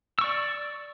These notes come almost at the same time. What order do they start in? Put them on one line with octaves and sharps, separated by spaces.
E6 C#6 D5